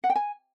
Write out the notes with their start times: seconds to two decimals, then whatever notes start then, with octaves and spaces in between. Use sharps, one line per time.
0.04 F#5
0.10 G5
0.16 G#5